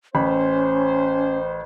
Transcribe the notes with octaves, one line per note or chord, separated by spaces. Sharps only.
A1 C#4 C5 B5